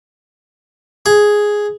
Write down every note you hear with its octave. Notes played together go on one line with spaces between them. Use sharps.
G#4